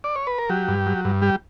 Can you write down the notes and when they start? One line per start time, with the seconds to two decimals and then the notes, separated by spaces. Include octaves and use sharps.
0.04 D5
0.16 C#5
0.27 B4
0.38 A#4
0.49 F#3 G4
0.68 G2
0.86 F#3
1.05 G2
1.22 G3 G4